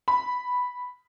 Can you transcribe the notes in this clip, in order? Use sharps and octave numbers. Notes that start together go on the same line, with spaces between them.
B5